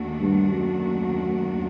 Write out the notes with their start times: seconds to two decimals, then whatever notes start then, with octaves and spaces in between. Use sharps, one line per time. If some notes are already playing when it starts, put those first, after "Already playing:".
Already playing: D#2 D#3 A3 D4 F#4
0.20 G2
0.51 F#2